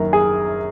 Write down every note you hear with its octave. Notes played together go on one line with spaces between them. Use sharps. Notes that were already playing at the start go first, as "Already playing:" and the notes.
Already playing: F#1 F#2 D#3 A#4
G#4 G#5